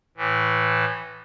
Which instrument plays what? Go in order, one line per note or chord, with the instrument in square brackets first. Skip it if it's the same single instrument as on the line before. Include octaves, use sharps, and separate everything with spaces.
[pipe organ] A2 E3